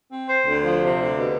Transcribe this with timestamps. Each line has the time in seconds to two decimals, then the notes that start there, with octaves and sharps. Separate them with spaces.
0.11 C4
0.29 C5
0.46 D2
0.64 F3
0.82 C3
0.98 D2
1.17 B2